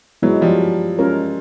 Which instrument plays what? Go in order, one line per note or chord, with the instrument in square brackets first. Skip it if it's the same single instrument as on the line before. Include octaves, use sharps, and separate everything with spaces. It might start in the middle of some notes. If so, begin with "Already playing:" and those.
[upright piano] F#3 [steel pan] G#3 B3 E4
[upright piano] F3 G3
[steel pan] G#3 C#4 F4 A#4 C#5